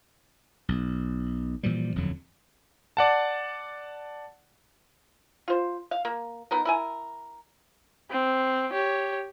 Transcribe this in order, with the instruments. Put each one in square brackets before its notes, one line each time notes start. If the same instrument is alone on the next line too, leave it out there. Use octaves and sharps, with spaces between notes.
[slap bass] B1
A#2 E3 F3 G3
D#1 F2 D3 F#3
[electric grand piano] D5 F#5 A5
[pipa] F4 C5
F5
A#3
B3 D#4 A#4
E4 A#4 G#5
[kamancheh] C4
G4 C#5